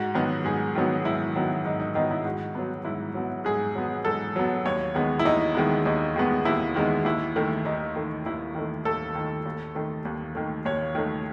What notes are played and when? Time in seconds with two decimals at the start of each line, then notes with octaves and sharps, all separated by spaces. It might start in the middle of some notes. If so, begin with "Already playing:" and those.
Already playing: G#2 F#4
0.14 D#3 F#3 B3
0.45 G#2 G#4
0.75 D#3 F#3 B3
1.04 G#2 E4
1.36 D#3 F#3 B3
1.65 G#2 D#4
1.80 D#4
1.95 D#3 F#3 B3 D#4
2.11 E4
2.25 G#2 F#4
2.55 F#3 B3
2.85 G#2 E4
3.15 F#3 B3
3.45 G#2 G#4
3.75 F#3 B3
4.05 G#2 A4
4.36 F#3 B3
4.65 D#2 C#5
4.95 D#3 G#3 B3
5.19 E4
5.25 D#2 D#4
5.55 D#3 G#3 B3
5.85 D#2 D#4
6.16 D#3 G#3 B3
6.45 D#2 E4
6.75 D#3 G#3 B3
7.05 D#2 E4
7.36 D#3 A3
7.65 D#2 D#4
7.96 D#3 A3
8.26 D#2 E4
8.55 D#3 A3
8.85 D#2 A4
9.15 D#3 A3
9.45 D#2
9.75 D#3 A3
10.05 D#2
10.35 D#3 A3
10.65 D#2 C#5
10.95 D#3 A3